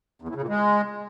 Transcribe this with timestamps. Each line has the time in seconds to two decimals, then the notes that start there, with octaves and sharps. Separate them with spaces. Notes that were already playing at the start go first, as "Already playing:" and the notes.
0.22 E2
0.28 A2
0.35 C#3
0.42 A#2
0.49 G#3